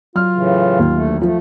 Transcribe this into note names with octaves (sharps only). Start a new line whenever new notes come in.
F#3 F4 F6
A2 C#3 E3
D#2
D2 A3
F3 A3